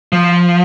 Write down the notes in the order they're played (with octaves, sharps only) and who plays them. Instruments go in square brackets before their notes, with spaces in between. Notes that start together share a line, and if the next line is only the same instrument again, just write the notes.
[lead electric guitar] F3